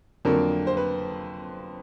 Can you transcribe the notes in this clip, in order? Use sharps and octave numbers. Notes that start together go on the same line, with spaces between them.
F2 D3 F#3 A#3 A#4
C5
B4